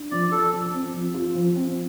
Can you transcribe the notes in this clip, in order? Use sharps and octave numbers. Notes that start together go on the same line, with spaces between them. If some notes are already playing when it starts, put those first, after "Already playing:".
Already playing: D4
F3 D5
F4 A4
F3
C4
F3
F4
F3
C4